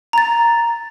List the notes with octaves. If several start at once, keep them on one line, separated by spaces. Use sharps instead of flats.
A#5 A6